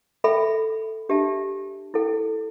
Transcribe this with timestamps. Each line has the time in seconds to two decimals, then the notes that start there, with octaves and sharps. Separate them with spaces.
0.24 A4 E5 G5 B5
1.09 D4 G4 E5 A5
1.94 E4 A4 G5